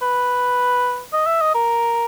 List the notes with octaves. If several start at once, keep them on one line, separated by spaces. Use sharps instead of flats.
B4
D#5
E5
D#5
A#4